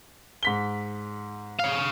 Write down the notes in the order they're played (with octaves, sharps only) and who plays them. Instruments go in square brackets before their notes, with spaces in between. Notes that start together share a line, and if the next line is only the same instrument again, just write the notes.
[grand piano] G#2 B6 G7
[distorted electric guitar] C#5 F5